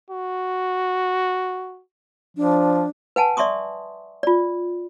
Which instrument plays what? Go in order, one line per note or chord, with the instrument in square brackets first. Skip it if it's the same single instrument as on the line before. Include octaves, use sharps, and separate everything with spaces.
[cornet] F#4
[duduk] F3 [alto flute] D4
[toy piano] B4 F#5 G#5 A5
D5 E5 C6 C#6 D#6
F4 D5